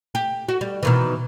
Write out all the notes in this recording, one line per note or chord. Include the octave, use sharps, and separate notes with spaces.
G4
F#4
G3
B2 D#3 E3